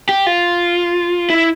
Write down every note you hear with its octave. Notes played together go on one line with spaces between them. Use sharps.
G4
F4
E4